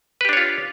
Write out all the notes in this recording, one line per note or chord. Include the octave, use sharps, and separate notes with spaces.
D4 F4 G4 B4 C#5